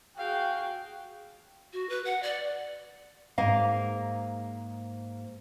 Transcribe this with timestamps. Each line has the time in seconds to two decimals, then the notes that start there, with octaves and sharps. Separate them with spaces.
0.18 F#4 G#4 F5 G5
1.73 F#4
1.89 B4
2.05 F#5
2.23 D5
3.38 G#2 A#3 D#5 F5